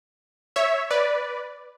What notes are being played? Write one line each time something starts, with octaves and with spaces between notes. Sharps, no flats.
C#5 E5
B4 D5